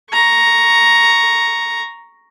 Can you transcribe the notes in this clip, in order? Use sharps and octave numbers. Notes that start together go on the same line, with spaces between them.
A#5 C#6